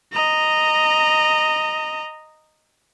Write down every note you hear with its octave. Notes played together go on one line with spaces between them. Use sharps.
D#5 A#5